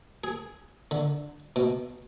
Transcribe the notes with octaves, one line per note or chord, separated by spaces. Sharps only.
G#4
D3
B2